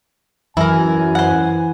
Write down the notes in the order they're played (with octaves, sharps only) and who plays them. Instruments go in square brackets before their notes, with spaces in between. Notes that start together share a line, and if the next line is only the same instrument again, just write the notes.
[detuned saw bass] F#2 [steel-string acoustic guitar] E3 [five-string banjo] E4 A#4 [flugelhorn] G#5
[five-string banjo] C5 F#5